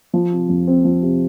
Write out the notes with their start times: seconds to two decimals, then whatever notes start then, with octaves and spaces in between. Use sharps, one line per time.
0.14 F3
0.31 C3
0.49 F2
0.67 C4
0.85 F3
1.02 C3